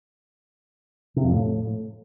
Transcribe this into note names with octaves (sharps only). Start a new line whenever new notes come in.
C3
F2
A2